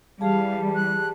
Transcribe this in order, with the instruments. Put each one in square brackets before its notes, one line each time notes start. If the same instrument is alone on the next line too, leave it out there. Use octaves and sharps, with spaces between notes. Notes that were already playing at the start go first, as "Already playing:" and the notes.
[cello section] E3 G3 [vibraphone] G4 G#4 A5 [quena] F5
[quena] F#6